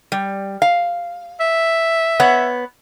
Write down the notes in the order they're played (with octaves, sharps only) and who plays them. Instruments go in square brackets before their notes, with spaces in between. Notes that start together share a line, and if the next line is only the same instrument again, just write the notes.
[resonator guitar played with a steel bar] G3
F5
[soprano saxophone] E5
[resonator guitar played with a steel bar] B3 C#5 F#5